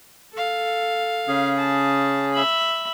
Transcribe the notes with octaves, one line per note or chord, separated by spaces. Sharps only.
A4 F5
C#3 C#4 G#4
A5
E5 B5